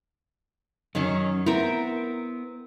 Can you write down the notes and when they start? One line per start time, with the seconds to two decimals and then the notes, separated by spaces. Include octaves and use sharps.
0.95 F#2 D#3 F#3 C#4
1.46 B3 C4 E4 A#4